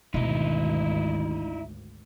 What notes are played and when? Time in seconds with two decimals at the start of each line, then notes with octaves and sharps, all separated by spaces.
0.14 G#1 D2 B2 D#3 D#4 E4